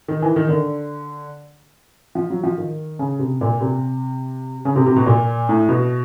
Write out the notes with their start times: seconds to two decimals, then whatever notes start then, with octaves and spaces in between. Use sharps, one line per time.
0.08 D#3
0.22 E3
0.36 D#3
0.49 D3
2.15 F3
2.30 F#3
2.43 F3
2.58 D#3
2.99 C#3
3.19 C3
3.41 A#2
3.61 C3
4.65 C#3
4.76 C3
4.86 C3
4.96 B2
5.06 A#2
5.49 A2
5.69 B2